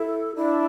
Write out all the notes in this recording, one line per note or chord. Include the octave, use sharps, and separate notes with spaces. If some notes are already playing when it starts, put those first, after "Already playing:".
Already playing: E4 A4
D4 E4